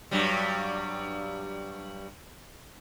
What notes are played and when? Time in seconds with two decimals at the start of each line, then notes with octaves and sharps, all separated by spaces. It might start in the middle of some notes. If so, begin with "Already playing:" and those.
0.11 G2 F#3 G3